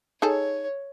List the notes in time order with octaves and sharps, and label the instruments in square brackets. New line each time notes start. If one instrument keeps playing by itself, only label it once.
[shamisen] D#4 G#4 A4 [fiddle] C#5